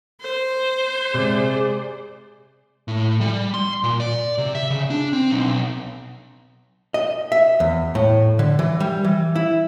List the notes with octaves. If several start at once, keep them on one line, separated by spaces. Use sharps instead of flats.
C5
C3 G#3 G#4 D5
A2
G3
C6
A#2
D5
C3
E5
C#3
D4
C4
B1
D#5
E5
E2
A2
D3
E3
G3
E3
E4